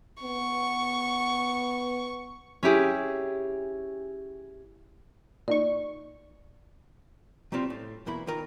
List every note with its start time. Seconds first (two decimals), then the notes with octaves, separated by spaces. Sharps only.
0.23 B3 C#6
2.63 C#4 E4 G4 G#4
5.48 A#2 D#4 D5 C#6
7.52 F#3 G3 C4 F4
7.70 A2
8.06 B1 E2 A#3 E4 B5
8.27 D#3 F4 A#4